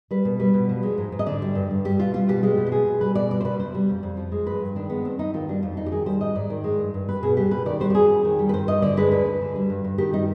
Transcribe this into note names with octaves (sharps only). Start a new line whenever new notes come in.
G3 B4
B2
G3 B4
B2
F3
G#3
G#2
G#2
D#5
D3 D5
G3
G2
G2
G3 G4
B2 F4
G3 F4
B2 G4
G#3 G4
B2
G4
G#3 G#4
B2
G3 B4
B2 D5
G3 D5
C5
B2 B4
C3 C5
G3
F2
F2
F3
G#3
G2 B4
G2
D#3 D4
G#3 B3
G2 C4
G2 D#4
D#3 F4
G3 D4
F2 F4
F2 D#4
G4
D#3 G#4
G3 C5
G#2 D#5
G#2 D5
D#3
G#3
G2
G2
G3 B4
B2 G#4
G3 G4
B2 B4
D#3 D5
G3 C5
G4
F2 G#4
F2
D#3
G3
B4
G2 C5
G2 D#5
D3 D5
G#3 B4
D2 B4
D2
D3
G3
G2
G2
D#3 G4
G3 D#4